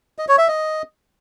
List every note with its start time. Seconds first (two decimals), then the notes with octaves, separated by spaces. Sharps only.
0.19 D#5
0.28 C#5
0.38 E5
0.48 D#5